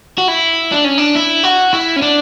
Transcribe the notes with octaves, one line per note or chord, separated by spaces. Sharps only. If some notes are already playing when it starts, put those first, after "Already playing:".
F#4
E4
D4
C#4
D4
E4
F#4
E4
C#4
D4